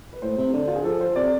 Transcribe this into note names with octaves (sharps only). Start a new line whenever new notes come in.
B4
A2 C5
C3
D3
F4
G#4
F3 A4
C5
C3 D5